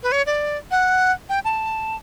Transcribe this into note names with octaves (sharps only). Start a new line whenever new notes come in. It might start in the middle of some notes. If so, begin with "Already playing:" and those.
B4
C#5
D5
F#5
G5
A5